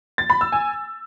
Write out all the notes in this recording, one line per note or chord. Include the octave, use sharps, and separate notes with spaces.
A6
B5
E6
G#5